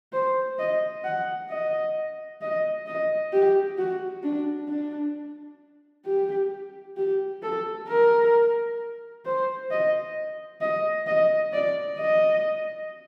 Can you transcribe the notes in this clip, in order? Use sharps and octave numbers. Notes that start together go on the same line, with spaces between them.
C5
D#5
F#5
D#5
D#5
D#5
G4
F#4
D4
D4
G4
G4
A4
A#4
C5
D#5
D#5
D#5
D5
D#5